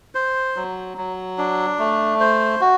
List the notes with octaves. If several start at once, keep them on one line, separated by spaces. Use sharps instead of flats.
C5
F#3
F#3
D4
A3
C5
F#4